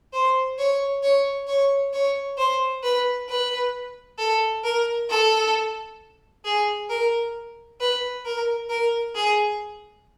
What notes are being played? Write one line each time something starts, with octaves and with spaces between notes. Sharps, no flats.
C5
C#5
C#5
C#5
C#5
C5
B4
B4
A4
A#4
A4
G#4
A#4
B4
A#4
A#4
G#4